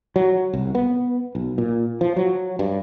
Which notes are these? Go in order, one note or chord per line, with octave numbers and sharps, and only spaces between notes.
F#3
C2
B3
B1
A#2
F3
F#3
G2